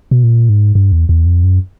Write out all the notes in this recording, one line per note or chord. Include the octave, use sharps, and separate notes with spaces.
B2
A#2
G#2
G2
E2
E2
F2
F#2